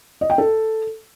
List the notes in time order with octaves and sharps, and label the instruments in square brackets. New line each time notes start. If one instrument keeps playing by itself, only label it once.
[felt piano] D#5
G5
A4